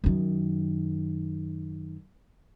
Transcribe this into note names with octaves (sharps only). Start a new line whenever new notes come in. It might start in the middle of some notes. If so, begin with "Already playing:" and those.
F#2 D#3